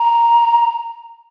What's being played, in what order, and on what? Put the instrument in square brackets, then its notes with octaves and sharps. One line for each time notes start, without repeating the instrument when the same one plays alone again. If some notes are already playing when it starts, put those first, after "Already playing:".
Already playing: [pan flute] A#5